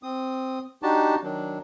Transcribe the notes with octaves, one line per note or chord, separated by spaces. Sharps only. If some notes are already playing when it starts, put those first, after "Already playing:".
C4 D#6
D4 D#4 F#4 G4 A5
D#3 F#3 D4